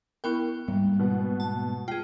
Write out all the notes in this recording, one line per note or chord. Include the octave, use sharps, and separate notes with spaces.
B3 E4 A#4 G5
G#2 G3 A#3
B2 B4 F#5
A5
F4 G#4 G5